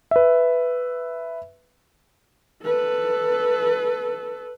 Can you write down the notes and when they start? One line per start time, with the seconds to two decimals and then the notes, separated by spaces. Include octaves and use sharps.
0.11 B4 E5
2.63 A4 B4